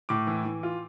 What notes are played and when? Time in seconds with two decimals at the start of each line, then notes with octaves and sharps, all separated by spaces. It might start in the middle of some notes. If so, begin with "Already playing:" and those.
0.09 A2 D6
0.27 E3
0.45 E3
0.63 F4